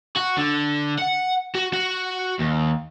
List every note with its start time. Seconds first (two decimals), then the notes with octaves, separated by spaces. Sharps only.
0.16 F#4
0.38 D3
0.98 F#5
1.55 F#4
1.73 F#4
2.40 D#2